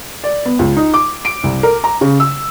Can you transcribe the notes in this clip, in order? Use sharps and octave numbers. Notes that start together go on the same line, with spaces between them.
D5
B3
C#2
D#4
D6
D7
C2
A#4
A#5
C#3
E6